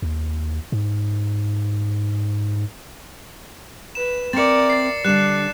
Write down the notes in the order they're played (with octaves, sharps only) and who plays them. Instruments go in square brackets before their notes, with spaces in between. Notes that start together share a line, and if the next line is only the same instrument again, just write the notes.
[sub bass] D#2
G#2
[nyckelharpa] B4 [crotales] E7
[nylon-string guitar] C4 E5 [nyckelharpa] A#4 D5 [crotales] A6 C#7
[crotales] A6 C7
[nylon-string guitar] D3 G3 [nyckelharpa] D4 [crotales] F#6 E7